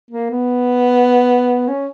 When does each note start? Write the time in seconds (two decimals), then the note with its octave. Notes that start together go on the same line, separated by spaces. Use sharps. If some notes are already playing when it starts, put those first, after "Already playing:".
0.11 A#3
0.30 B3
1.68 C#4